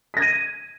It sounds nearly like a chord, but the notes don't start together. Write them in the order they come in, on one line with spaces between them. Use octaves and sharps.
B6 A#6 G#6 D#7